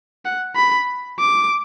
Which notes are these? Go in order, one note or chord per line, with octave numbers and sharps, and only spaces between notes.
F#5
B5
D6